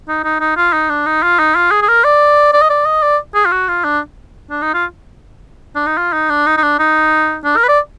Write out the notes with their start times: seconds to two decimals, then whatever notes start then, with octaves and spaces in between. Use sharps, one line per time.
0.08 D#4
0.24 D#4
0.40 D#4
0.57 F4
0.73 D#4
0.89 D4
1.06 D#4
1.23 F4
1.39 D#4
1.55 F4
1.71 G#4
1.82 G#4
1.88 A#4
2.04 D5
2.53 D5
2.62 D#5
2.70 D5
2.86 D#5
3.03 D5
3.35 G#4
3.45 F4
3.52 F#4
3.68 F4
3.84 D4
4.50 D4
4.62 D#4
4.74 F4
5.75 D4
5.87 D#4
5.97 F4
6.13 D#4
6.30 D4
6.46 D#4
6.57 D#4
6.63 D4
6.79 D#4
7.44 D4
7.56 A#4
7.64 B4
7.68 D5